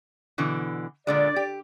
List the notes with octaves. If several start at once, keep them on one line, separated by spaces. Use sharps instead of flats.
B2 D3 E3
A#2 D3 G#3 D5
G4